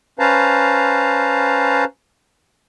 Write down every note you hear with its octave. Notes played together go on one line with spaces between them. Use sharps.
C#4 B4 C5 F5 A5 A#5